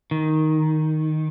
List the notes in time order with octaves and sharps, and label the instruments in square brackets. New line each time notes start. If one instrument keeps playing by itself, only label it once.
[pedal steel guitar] D#3